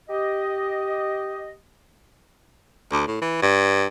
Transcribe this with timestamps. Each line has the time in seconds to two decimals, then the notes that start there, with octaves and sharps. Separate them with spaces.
0.10 G4 D#5
2.92 D2
3.07 A2
3.21 E3
3.42 G2